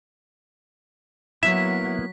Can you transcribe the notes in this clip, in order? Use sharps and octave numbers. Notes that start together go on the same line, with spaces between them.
F#3 A#3 B3 E4 E5 B6